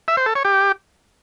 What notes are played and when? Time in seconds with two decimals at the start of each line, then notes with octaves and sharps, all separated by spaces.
0.08 E5
0.17 C5
0.26 A4
0.35 C#5
0.45 G4